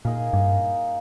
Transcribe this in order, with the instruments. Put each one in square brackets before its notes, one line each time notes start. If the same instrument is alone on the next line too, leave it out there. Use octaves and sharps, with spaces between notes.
[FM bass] A#2 [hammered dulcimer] A#3 D#4 G#4
[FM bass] G2